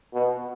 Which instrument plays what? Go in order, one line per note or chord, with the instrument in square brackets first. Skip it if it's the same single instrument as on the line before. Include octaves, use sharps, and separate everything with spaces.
[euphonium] B2